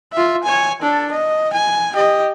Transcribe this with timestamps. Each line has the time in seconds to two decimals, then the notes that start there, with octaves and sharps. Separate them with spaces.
0.13 F4 E5
0.44 C#5 G#5
0.82 D4 A4
1.12 D#5
1.53 G#5
1.93 G4 D#5